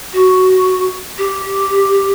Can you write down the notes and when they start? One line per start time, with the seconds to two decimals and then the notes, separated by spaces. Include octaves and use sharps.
0.13 F#4
1.18 G4